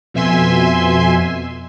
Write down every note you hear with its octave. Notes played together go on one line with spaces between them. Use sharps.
F2 B2 E5 G#5 C6